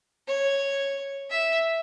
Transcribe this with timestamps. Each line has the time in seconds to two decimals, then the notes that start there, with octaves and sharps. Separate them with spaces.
0.28 C#5
1.30 E5